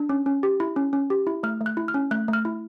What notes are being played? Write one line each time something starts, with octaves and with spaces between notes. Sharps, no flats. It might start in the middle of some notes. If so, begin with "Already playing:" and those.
Already playing: D4
C#4
C#4
G4
E4
C#4
C#4
G4
E4
A3 F6
A3
F#6
E4
F6
C#4
A3 F#6
A3
F6
E4